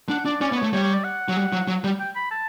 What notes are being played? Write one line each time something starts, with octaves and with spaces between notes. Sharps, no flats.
D4 F#5
D4 D5
C#4 D5
B3
C#5
A3
G3 C#5
C#5
D5
F#5
F#3
G3
F#3
F#3
G3
G5
B5
A5